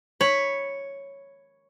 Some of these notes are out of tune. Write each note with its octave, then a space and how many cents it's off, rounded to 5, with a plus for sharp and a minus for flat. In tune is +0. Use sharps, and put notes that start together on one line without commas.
C#5 +0 B5 +0